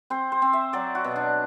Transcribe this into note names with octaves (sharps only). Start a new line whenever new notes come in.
C4 C5
C5
C4
E5
F#3 D5
F#4
B2
D4